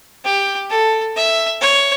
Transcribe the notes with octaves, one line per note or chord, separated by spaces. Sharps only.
G4
A4
E5
C#5